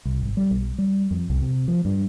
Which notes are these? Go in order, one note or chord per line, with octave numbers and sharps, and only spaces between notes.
C2
G#1
G3
B1
G3
F2
C2
C3
F3
G2